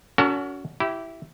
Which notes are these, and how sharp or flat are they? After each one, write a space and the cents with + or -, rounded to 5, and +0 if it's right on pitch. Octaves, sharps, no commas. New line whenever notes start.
C#4 +40 F#4 +0 A#4 -45
E4 +0 G4 -20